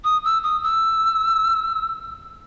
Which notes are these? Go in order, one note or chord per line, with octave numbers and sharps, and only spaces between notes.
D#6
E6
D#6
E6